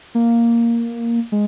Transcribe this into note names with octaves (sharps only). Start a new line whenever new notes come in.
A#3
G#3